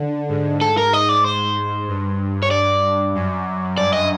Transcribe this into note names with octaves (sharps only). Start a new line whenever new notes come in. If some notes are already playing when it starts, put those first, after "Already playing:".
Already playing: D3
G#2
A4
A#4
D#5
D5
C5
G2
C#5
D5
F#2
G2 D5
D#5